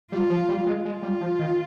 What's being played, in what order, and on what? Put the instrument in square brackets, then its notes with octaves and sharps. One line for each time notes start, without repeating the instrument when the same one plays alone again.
[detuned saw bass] G3 [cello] F4
[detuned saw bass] F3
G3
G#3
[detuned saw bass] G#3 [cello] F4
[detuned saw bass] G3
F3
D#3